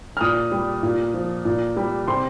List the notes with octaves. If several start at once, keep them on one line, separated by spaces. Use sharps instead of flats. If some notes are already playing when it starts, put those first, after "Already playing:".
F6
A#2 D#6
G3
A#2
F3
A#2
G3
C3 C6